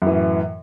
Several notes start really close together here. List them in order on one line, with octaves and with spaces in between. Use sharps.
F#2 E3 A2